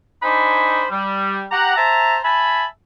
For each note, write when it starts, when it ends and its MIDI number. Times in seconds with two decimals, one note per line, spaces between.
0.23 0.86 62
0.23 0.86 63
0.23 0.86 72
0.23 0.86 80
0.23 0.86 83
0.91 1.44 55
1.52 1.74 67
1.52 1.74 78
1.52 1.74 82
1.76 2.18 72
1.76 2.18 76
1.76 2.18 81
1.76 2.18 82
2.24 2.64 76
2.24 2.64 80
2.24 2.64 81
2.24 2.64 83